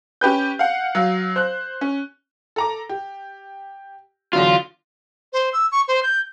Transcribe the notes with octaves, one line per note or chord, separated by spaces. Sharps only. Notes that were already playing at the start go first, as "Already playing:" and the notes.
C#4 G4 B4 G6
F5 F#5
F#3 F5
C5 F#6
C#4
A4 A#5 D6
G4
E2 D3 F#3 F4
C5
E6
C#6
C5
G6